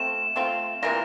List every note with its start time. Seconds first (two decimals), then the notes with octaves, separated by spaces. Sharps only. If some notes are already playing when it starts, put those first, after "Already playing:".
Already playing: A3 C4 F4 E7
0.36 A3 C4 F4
0.83 C3 E3 A#3 F4 A#6